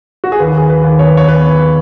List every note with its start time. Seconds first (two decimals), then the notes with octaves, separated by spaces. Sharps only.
0.24 F#4
0.32 G#4
0.40 D#2 B4
0.57 G#4
0.70 B4
0.84 D#2
0.99 C#5
1.08 B4
1.17 C#5
1.28 B3 B4